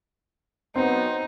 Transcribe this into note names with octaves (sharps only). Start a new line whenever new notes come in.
F#3 B3 C4 D#4